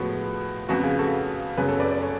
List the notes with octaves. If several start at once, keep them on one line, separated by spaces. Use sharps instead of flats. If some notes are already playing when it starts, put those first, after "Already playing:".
Already playing: A2 F3 G#3 B3 F#4
F2 C#3 G#3 B3 F#4
F4 G#4
F#4 A4
F#2 C#3 F#3 B3 G#4 B4
A4 C#5
B4 D5
B4 D5
A4 C#5